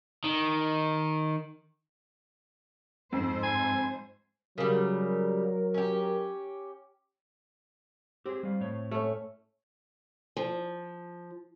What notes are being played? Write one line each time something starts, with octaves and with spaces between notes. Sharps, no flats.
D#3
F2 G#2 C5
G#5
C#3 F#3 G3 A#4
C#4 G4
C4 G4 G#4
G3 F5
A2 C#5
A3 C#4
F3